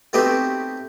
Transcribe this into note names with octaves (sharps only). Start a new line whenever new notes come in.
A3 B3 C4 D#4 F#4 G4